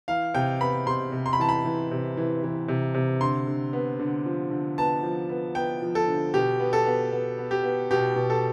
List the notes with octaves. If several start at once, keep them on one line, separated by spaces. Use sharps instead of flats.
E3 F5
C3 G5
B3 B5
C3 C6
C3
C6
B5
E3 A5
B5
E3
C3
E3
E3
C3
C3
D3 C6
D3
B3
D3
F3
D3
B3 A5
F3
B3
B3 G5
F3
A4
D3
B2 G4
B3
A4
B3
B3
B3
G4
B3
B2 G4
B2
A4